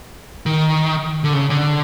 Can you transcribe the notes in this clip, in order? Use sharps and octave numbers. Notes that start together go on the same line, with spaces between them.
D#3
D3
C#3
D3